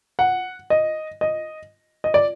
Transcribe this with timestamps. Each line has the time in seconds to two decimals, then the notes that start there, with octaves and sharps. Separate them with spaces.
0.19 F#5
0.70 D#5
1.21 D#5
2.04 D#5
2.14 D5